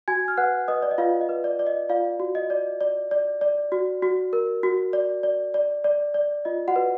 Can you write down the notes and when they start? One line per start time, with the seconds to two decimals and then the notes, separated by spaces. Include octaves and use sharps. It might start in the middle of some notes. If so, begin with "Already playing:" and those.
0.08 F#4 G#5 G#6
0.28 F6
0.37 B4 F#5 F#6
0.68 B4 D#5 D#6
0.82 D5
0.91 D#5
0.98 F4 B4 F5
1.21 D#5
1.29 B4
1.44 D5
1.59 D5
1.66 D#5
1.89 F4 D5 F5
2.20 F#4
2.35 D#5
2.50 D5
2.81 D5
3.11 D5
3.41 D5
3.72 F#4
4.02 F#4
4.33 A#4
4.63 F#4
4.93 D5
5.23 D5
5.54 D5
5.84 D5
6.14 D5
6.45 F4 D#5
6.68 F#4 F#5
6.76 B4